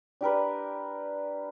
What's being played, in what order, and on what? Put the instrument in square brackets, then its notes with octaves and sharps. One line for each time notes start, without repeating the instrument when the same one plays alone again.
[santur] D4 G4 A#4 B4